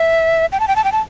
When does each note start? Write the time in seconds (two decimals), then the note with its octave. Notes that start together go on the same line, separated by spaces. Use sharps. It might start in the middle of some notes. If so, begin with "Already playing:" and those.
Already playing: E5
0.52 G5
0.60 A5
0.68 G5
0.76 A5
0.84 G5
0.92 A5